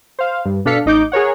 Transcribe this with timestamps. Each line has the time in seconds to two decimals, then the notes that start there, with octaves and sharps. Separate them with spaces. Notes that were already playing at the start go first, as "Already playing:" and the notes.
0.19 C5 F5
0.45 G2
0.65 B2 D4 A4 F5 B6 C#7
0.86 A1 D#4 D6 G6
1.12 G#4 A#4 C#5 F#5